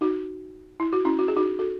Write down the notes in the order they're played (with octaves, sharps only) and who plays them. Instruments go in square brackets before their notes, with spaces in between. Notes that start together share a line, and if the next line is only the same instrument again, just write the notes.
[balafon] D#4 F#4
E4
F#4
C#4 E4
F#4
G#4
D#4 F#4
F#4 A4